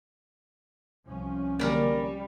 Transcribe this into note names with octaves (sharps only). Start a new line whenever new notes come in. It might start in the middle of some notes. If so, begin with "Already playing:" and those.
C2 F3 C#4
D3 F#3 G3 A#3 A#4 B4 D5